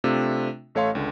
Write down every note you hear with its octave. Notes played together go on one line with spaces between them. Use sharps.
C3 A3 C4 D4 F4
A1 A3 C#5 F5 C6
C#2 D3